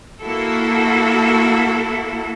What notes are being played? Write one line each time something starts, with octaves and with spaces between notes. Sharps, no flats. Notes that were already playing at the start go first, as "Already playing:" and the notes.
A#3 E4 F#4 A4